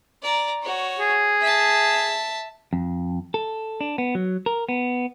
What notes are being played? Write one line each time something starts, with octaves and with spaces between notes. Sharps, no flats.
D5 A#5
F#4 C#5
G#4
E5 A5
F2
A4
D4
B3
F#3
A#4
B3